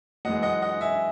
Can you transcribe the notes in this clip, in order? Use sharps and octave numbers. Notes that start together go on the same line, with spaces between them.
F#2 E3 G#3 D#5 F#5
D#5 F#5
D#5 F#5
E5 G#5